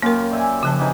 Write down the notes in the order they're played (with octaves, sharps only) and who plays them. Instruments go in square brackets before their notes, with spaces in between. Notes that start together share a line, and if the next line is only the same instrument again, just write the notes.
[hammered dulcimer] F#2 F4 G4 [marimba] A#3 A#4
[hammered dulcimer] D5 E5 G#5
[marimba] C#3 F3 A5
[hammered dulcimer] C3 E3 D#4